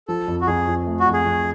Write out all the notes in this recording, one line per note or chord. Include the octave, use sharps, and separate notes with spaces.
F3 A4
F2
F#4
F2 G#4
F2
A3
F#4
F2
G#4
F2